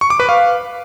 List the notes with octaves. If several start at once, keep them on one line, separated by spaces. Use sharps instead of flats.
C#6
D6
B4
F5